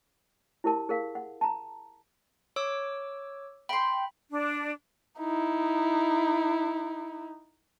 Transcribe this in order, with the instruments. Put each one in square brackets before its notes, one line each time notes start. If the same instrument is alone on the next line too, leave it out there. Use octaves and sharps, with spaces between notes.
[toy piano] E4 G4 A#4 A5
G#4 A#4 F5
F#5
A5 A#5
[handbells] C#5 D6 E6
[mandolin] G5 C6 [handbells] B5
[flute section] D4
[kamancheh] D#4 E4